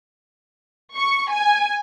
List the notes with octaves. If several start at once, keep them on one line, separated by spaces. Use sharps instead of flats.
C#6
G#5